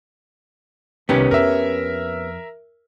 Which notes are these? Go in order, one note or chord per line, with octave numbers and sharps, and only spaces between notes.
C2 D#3 B3 C#4 G4
F2 A#4 E5